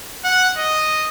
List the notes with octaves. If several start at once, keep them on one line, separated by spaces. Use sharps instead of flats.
F#5
D#5